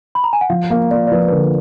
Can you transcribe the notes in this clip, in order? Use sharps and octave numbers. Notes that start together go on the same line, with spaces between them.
B5
A#5
G#5
F#5
F3 F5
A#3 F5
A#3 D5
D5
F3 B4
B4
D3 A#4